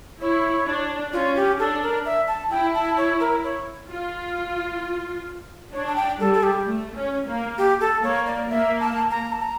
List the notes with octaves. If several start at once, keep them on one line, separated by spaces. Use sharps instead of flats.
E4 C#5
D4
C#4 F4
G4
D4 A4
A#4
E5
A5
E4 G5
A5
C#5
A#4
C#5
F4
D4 C#5
A5
G5
G3 A4
A4
G4
A3
C#4
A#3
G4
A4
A#3 C#5
D5
A#3 E5
A5
A#5
A5
A#5